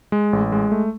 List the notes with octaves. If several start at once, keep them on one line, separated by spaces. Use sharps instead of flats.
G#3
A1
G#3
A3